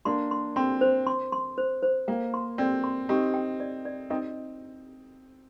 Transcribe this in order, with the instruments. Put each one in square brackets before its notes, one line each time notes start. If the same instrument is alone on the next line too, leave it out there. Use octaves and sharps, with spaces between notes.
[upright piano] A#3 D4 [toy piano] C6
[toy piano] C6
[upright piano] C4 [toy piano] C6
[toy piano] C5
C6
C6
C5
C5
[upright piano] A#3 [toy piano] G5
[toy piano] C6
[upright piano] C4 [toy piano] D5
[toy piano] C6
[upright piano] C4 D#4 [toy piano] G4
[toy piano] G5
D5
D5
[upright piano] C4 D#4 [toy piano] D#5